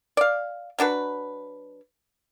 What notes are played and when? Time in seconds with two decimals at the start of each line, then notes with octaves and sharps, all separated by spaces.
0.17 D5 F5
0.79 F#3 D4 F#4 B4